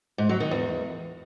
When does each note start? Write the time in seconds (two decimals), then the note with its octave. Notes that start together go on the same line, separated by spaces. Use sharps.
0.18 G#2
0.29 F#3
0.40 D#3
0.51 E2